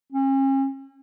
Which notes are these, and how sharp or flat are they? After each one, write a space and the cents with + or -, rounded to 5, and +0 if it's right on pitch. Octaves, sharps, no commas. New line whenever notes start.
C#4 -40